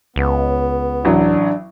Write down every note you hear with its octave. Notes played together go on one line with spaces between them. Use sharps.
C#2 B3
A1 F#3 D4